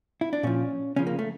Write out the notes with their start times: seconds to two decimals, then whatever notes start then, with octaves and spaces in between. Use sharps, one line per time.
0.21 E4
0.33 D4
0.43 A#2 F3 C#4
0.96 C#3 F3 C#4
1.07 A#3
1.19 A3